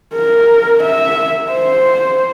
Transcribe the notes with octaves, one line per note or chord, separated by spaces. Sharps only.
A#4
E5
C5